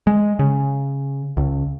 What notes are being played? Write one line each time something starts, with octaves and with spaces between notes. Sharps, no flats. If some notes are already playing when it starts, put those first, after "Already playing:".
G#3
C#3
C#2